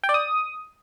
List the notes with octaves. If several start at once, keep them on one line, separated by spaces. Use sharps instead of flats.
G5
D5
D#6